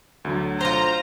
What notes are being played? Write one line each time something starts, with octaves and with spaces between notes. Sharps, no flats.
D2 D3 F#3
F4 C5 A#5